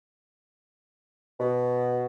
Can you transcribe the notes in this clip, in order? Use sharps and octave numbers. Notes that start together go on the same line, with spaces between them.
B2